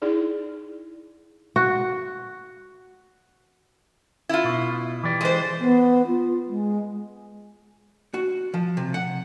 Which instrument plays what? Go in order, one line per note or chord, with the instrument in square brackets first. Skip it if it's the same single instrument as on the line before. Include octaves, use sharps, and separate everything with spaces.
[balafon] D#4 E4 G#4 D5
[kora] F#4
[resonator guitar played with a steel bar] E4 F4
[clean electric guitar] B2
E3 G4 D5
[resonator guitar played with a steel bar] G#3 C5
[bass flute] B3
F4
G#3
[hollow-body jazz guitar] F#4
F3
C3
F#5